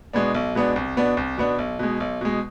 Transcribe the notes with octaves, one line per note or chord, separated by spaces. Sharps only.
B2 G#3 B3 D4
B1
B2 G#3 B3 D4
C2
B2 B3 D4
C2
B2 B3 D4
B1
B2 G#3
B1
B2 G#3